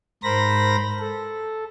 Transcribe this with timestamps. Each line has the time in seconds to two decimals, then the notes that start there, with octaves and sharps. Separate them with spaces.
0.23 G#2 A#4 C5 B5 A#6
1.00 A4